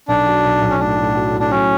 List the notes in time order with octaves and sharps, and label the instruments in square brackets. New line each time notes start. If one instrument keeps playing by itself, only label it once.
[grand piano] B1 [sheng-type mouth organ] D4
[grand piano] F#3
B1
B1
[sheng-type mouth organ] C#4
[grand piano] A2 [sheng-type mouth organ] D4
[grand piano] A2
F#3
A2
[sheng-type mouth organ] D4
[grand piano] F#3 [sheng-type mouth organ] C#4